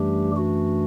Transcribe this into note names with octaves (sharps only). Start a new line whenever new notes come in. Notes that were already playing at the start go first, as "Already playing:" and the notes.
Already playing: F#2 E3 G3 A3 D4 G4
F#4